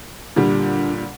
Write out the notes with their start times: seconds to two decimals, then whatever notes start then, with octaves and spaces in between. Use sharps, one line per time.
0.36 A#2 D3 G3 D4